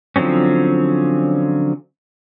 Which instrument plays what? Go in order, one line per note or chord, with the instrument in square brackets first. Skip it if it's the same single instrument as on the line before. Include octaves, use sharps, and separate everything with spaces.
[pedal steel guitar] D3 F3 F#3 C4 C#4